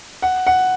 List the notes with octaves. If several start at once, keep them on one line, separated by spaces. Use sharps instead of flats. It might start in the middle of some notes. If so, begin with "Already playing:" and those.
F#5
F#5